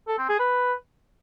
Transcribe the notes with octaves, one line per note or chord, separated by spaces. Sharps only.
A4
C4
G#4
B4